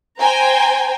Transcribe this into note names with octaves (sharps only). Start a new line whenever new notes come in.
C5 G5 G#5 A#5